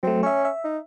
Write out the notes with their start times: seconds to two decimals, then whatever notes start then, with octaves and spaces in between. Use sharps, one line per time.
0.03 F#3 A3 C4
0.23 C#4 C#5 E5
0.45 E5
0.64 D#4